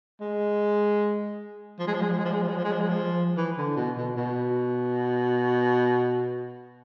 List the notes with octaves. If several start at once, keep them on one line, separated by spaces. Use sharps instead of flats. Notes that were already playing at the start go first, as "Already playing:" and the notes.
G#3
F3
G#3
F3
G#3
F3
G#3
F3
G#3
F3
G#3
F3
G#3
F3
G#3
F3
E3
D3
B2
B2
B2